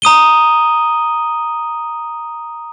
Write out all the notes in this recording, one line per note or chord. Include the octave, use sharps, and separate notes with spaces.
A#5 D#6 D#7 G7